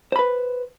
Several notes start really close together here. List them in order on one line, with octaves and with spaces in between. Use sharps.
C5 B5 B4